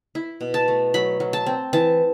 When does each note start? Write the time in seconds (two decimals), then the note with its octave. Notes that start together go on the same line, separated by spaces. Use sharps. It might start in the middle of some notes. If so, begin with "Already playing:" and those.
0.15 E4
0.41 B2
0.54 A5
0.68 A3
0.94 F#3 B5
1.20 F#3
1.33 A5
1.46 C4
1.73 E3 A5